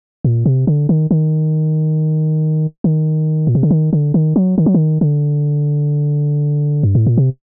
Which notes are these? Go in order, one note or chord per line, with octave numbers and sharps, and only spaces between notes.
A#2
C3
D3
D#3
D#3
D#3
A#2
C3
D3
D#3
D3
D#3
F#3
D#3
F#3
D#3
D3
G2
A2
A#2
C3